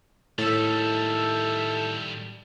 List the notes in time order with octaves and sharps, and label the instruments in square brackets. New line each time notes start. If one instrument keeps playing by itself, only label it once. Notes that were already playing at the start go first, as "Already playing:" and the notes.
[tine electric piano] A2 [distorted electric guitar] D#3 G3 [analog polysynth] A4 E5